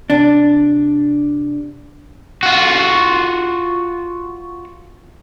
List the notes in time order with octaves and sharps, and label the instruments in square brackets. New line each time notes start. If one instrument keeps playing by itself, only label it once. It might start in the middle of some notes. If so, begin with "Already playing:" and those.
[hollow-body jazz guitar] C3 D4
[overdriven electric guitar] F4 F#4